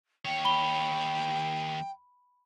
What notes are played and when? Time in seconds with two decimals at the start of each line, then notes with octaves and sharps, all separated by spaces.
0.25 D#2 C#5 G5
0.45 B5 G7